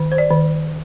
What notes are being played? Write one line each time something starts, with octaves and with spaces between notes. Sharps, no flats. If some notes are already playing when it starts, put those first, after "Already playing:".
Already playing: D#3
C5
D5
D#3